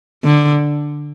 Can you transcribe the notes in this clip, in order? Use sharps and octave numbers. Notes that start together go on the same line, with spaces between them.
D3